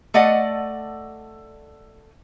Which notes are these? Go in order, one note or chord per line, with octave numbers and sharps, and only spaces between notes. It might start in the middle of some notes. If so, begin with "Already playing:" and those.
A3 D5 D#5 F#5